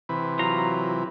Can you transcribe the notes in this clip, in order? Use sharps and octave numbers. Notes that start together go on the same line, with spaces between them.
C3 E3 B4
F#3 F4 A#5